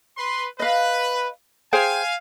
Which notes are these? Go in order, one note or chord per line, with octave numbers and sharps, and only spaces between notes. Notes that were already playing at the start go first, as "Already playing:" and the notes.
B4 C6
B4 D#5 F5
G#4 C5 F5 G5 G#5